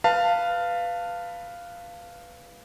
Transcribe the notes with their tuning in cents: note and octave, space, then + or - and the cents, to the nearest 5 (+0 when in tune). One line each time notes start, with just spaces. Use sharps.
B4 +0 F5 -5 A5 +20